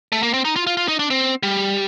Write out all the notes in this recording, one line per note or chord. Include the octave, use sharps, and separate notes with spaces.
A3
A#3
C4
D#4
F4
F4
F4
D#4
D4
C4
G3